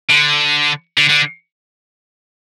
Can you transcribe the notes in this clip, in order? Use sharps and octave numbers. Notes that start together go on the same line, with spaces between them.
D3
D3
D3